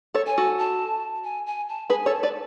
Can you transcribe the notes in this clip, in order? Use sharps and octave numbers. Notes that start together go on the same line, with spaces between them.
A4 C#5
G#5
F#4 A4
A5
G#5
G#5
A5
G#4 B4 G#5
A4 C#5
A5
B4 D5